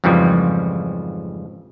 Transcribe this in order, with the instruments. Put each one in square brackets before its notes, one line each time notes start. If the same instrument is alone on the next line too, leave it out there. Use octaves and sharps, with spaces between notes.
[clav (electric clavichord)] F2 G#2 C#3 E3 F3 G3